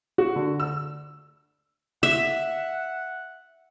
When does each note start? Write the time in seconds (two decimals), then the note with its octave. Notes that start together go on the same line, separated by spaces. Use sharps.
0.18 F#4
0.36 D3
0.60 E6
2.03 E5 F#5